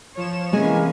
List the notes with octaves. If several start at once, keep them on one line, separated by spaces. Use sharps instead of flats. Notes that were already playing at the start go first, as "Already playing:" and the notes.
F3 C#5 E7
C3 E3 G#3 A#3 C#4 G#4 D#5 G#5